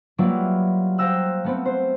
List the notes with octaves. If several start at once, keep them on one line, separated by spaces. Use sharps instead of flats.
F#3 G3 A#3 E4 F4 B4
C5 F5 G5 A#5 E6 F#6
A3 B3 C4
C5